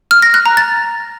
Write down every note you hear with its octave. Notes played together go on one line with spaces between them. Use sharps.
F6
A#6
F#6
A#5
A6